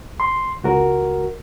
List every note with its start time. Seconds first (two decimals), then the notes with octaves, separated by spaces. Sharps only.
0.20 C6
0.63 C#2 F#4 A#4